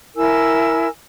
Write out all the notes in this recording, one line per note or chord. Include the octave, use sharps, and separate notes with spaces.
E4 A#4 G#5 E6